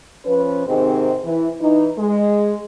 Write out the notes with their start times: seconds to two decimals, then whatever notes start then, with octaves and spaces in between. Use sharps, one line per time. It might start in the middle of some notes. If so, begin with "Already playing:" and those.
0.25 F3 C#4 B4
0.67 G#2 C3 D#3 G#3 C4
1.23 E3
1.60 E3 D#4
1.97 G#3